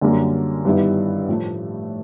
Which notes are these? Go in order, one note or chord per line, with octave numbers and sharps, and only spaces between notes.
F#2 D3 G3 A#3
G2 D#3 G3 B3 E4
A2 F3 A3